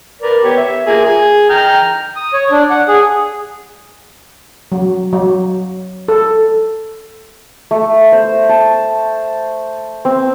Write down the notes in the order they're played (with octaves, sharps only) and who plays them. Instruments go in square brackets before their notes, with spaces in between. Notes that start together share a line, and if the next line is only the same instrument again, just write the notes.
[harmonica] A#4 B4 D5
B3 G4 C#5
E5
A#3 F4 G#4
G#4
G5 A#5 F6
[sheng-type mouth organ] D#6
C#5
D4
F#5
G#4
[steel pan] F#3
F#3
A4
[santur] A3
C5
A5
C4